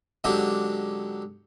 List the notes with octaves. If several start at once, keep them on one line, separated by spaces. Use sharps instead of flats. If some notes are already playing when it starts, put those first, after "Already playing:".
G#2 D3 F#3 C4 D4 G4